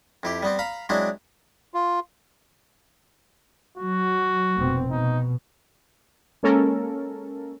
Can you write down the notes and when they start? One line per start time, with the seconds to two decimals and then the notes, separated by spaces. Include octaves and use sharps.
0.23 F2 E4 G4
0.43 G3 B3 C4
0.59 F5 A#5 B5
0.89 F#3 G#3 C4 D4 E4
1.74 F4
3.77 F#3 F#4
4.58 F1 B2 C4
4.91 B2 D#4
6.43 G#3 A#3 C#4 A4 A#4